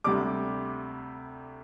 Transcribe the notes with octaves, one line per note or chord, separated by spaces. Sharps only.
D2 C3 G3 D6